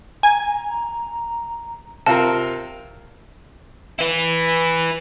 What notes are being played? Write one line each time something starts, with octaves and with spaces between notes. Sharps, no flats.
G#5 A#5
C3 F4 A#4 A5
E4 B4